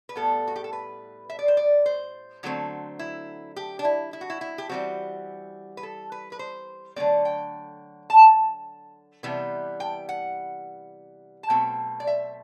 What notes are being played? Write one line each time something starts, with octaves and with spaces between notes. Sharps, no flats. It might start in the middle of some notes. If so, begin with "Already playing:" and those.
B4
A2 G3 B3 A4
F#4
G4
A4
B4
E5
D5
C5
D5
C5
D3 F#3 A3 C4
E4
G4
D4
E4
E4
F#4
E4
E4
G4
E3 G3 C4 F#4
B4
A4
B4
B4
C5
D3 F#3 A3 C4 D5
G5
A5
C3 E3 G3 B3
G5
F#5
A5
B2 F#3 A3 C4 G5
D5
E5